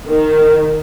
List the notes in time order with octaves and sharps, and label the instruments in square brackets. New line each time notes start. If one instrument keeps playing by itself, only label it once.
[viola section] D#3